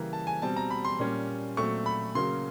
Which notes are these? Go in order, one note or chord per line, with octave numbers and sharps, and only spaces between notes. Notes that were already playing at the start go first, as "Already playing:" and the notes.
Already playing: C#3 E3 G3 A#3 A#5
A5
G#5
B2 G3 C4 A5
A#5
B5
C6
A#2 G3 A#3 C#4
A#2 F#3 A3 C4 C#6
B5
C#3 F#3 A#3 C#4 C6